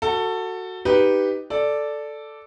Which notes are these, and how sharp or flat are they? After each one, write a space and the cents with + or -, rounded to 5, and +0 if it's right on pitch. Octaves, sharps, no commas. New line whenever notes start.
F#4 +0 A4 +20
D#4 +0 G4 +0 B4 +0
A4 +0 D5 +0